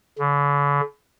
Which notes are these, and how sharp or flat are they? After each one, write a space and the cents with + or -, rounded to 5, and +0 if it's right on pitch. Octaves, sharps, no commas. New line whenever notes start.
D3 -45